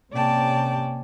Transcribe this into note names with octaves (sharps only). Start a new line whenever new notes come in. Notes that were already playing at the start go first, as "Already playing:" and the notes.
C3 A#3 C#4 D5 G5 A5